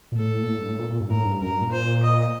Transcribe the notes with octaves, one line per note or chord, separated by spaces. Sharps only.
A#2
A2 A4
A#2
A2
G2
A2
A#2
A#2
G2
A2 A#4
G2
F#2 A#4
G2
A#2
C5
D#5